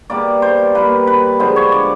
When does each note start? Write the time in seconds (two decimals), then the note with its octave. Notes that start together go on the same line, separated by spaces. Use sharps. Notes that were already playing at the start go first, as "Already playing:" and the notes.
0.10 B2 G3 A#3 D5
0.42 C5
0.75 B2 G3 A#3 B4
1.07 B4
1.39 D3 F3 G#3 B3 C5
1.56 C#5
1.72 D5